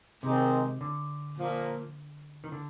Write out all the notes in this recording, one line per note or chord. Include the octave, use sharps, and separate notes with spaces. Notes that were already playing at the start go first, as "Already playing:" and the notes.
C3 D#3 G#3 C4 D#4
D3
A#2 F3 A#3
D#3
D3